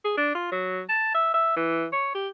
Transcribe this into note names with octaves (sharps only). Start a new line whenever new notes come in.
G#4
D4
F4
F#3
A5
E5
E5
E3
C#5
G4